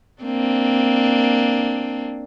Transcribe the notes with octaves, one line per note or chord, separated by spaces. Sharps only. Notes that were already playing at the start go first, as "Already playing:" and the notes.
A#3 C4 D4